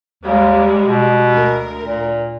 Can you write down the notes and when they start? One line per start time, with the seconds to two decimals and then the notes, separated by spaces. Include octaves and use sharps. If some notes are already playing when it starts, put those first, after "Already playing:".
0.23 D#2 G3 G#3
0.85 B2
1.33 D2 A#4
1.84 A#2